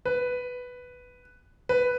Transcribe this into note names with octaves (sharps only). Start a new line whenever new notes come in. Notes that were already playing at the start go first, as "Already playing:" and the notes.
B4
B4